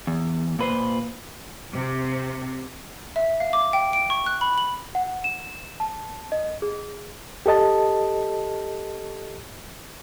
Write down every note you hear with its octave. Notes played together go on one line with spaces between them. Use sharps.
E2
A#2 B4 C5
C3
E5
F5
D6
G5
D7
C#6
F#6
B5
F#7
F#5
E7
A5
D#5
G#4
G4 A4 D#5 A5